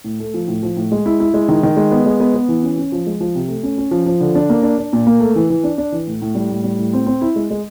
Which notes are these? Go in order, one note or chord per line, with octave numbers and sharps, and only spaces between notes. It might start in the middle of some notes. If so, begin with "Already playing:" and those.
A2
A3
F3
A2
F3
A2
G#3
E4
E4
G#3
D#3
D#3
G#3
B3
G#3
B3
B3
E3
C#4
C#4
F3
G#3
F3
C3
A3
C#4
C#4
F3
F3
D3
D4
A#3
D4
D4
A#2
A#3
A3
E3
E3
D4
D4
E3
A2
A2
G3
A2
G3
A2
C4
C4
E4
G#3
G#3